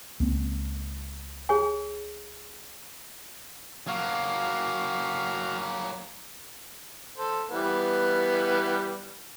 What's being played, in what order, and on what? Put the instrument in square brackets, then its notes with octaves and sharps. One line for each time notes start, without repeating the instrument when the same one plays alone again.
[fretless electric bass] C#2 A#3 C4
[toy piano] G#4 C#5 G#5
[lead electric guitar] F#3 A#3 [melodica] F#4 F5
[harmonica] A4 C5
E3 G3 B3